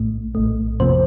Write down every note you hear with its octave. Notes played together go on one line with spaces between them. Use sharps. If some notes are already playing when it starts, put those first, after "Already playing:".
Already playing: A#1 A2 A3
A#1 A2 A3
F2 C3 F3 A#3 C5